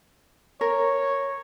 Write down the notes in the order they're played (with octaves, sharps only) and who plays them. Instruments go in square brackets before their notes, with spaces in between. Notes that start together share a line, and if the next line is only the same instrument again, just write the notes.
[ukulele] A#4 [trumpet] C#5